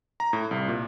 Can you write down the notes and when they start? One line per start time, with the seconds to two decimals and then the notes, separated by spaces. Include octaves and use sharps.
0.20 A#5
0.33 A2
0.51 C2
0.68 A#2